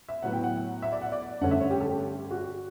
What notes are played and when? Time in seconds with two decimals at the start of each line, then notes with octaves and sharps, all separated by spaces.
0.09 E5
0.22 A2 F#3 B3 F#5
0.33 G5
0.44 F#5
0.82 E5
0.92 D5
1.01 F#5
1.12 D5
1.41 G2 D3 A3 C#4 F#5
1.51 E5
1.60 C#5
1.70 G4
1.80 A4
1.90 G4
2.31 F#4